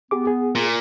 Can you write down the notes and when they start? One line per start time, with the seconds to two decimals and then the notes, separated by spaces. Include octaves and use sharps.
0.11 B3 G4 G#4 D6
0.27 G#4
0.55 A#2